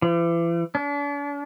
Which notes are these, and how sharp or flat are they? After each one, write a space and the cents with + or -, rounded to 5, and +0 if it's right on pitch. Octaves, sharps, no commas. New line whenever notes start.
E3 +40
D4 -40